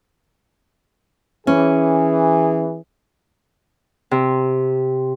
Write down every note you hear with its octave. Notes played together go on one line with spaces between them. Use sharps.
E3 C#4 G#4
C3